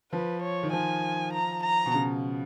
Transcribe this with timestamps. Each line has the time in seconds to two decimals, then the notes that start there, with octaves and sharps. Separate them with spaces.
0.12 F3 B4
0.42 C#5
0.63 D#3
0.72 F3 G#5
1.34 A#5
1.63 A#5
1.86 B2
1.94 C#3